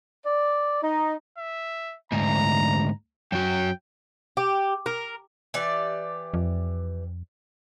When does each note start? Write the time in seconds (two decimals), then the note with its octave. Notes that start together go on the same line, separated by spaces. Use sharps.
0.25 D5
0.81 D#4
1.38 E5
2.12 D2 G#2 A#5
3.32 F#2 F#3 G5
4.37 G4
4.86 A#4
5.54 E3 G4 D5
6.34 F2